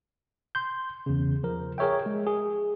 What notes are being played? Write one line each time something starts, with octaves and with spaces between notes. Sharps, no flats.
C6 G6
E2 C#3
F3 A#4
G#4 A#4 C#5 E5 G5
G#3
G#4